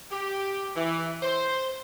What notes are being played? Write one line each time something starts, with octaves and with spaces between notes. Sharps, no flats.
G4
E3
C5